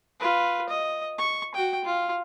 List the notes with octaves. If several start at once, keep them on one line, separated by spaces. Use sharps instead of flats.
F4 B4
D#5
C#6
F#4 G5
F4